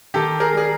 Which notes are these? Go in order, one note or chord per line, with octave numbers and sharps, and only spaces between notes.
D#3 G4 A4
G#4 A#4
G3 G#4